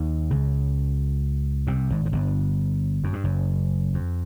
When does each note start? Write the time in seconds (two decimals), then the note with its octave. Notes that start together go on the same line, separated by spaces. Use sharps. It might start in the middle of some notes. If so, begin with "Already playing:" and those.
Already playing: D#2 D#3
0.31 C#2 C#3
1.67 C2 C3
1.90 G#1 G#2
2.05 G#2
2.12 G1 G2
3.04 F#2
3.13 G2
3.24 F#1 F#2
3.94 F2